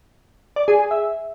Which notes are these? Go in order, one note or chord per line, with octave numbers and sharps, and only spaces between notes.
D5
G#4
G#4
E5